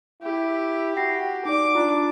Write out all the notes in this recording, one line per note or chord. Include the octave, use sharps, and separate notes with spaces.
E4 G4
F#4 G5 A#6 C7
D#4 D5 D6
D4 F4